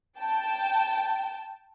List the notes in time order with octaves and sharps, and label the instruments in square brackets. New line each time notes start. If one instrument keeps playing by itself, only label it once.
[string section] G5 A5